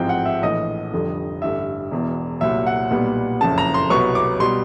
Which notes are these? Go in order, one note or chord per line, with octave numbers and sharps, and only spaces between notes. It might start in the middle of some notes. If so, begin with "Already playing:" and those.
Already playing: A1 G#2 F3 G#3 C4 G5
F#5
E5
A#1 A2 E3 D#5
F1 F2 D3 G3
A1 G2 D3 E5
E1 E2 B2
C2 A#2 F#3 E5
F#5
B1 A#2 G3 B3
F#1 F2 C#3 A5
A#5
C6
C2 B2 F#3 B3 C#6
D6
B2 G3 C6